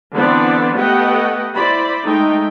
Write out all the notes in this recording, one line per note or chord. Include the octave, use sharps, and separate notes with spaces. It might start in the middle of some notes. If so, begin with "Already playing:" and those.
D3 E3 B3 C4 D4 D5
A3 B3 G4 D#5 F#5 G5
E4 C5 D5 B5
G#3 A3 D#4 G5